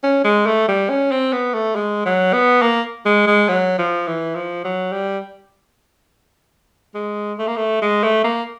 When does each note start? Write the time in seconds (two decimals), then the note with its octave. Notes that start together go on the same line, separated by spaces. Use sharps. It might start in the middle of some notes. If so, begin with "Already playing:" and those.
0.03 C#4
0.24 G#3
0.46 A3
0.68 G3
0.90 C#4
1.11 C4
1.33 B3
1.54 A3
1.75 G#3
2.05 F#3
2.33 B3
2.62 A#3
3.06 G#3
3.27 G#3
3.48 F#3
3.78 F3
4.07 E3
4.35 F3
4.64 F#3
4.92 G3
6.94 G#3
7.38 A3
7.47 A#3
7.57 A3
7.82 G#3
8.03 A3
8.24 A#3